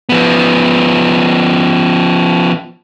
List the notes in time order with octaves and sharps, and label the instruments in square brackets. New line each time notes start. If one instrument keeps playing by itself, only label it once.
[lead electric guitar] F3 B3